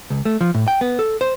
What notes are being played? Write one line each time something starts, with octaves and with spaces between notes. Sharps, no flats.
C#2
A3
F3
A2
G5
B3
A4
C5